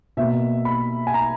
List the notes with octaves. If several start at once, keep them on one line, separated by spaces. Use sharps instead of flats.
B2 A#3 E5
B5
G#5
A#5